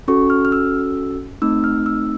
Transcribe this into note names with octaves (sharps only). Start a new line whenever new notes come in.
C#4 F#4 A4 C#6
F6
F6
E6
A3 C4 D#4 E6
F6
E6